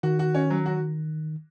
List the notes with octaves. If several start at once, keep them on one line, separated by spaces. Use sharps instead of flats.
D#3 F#4
F#4
C#4
F#3
F#4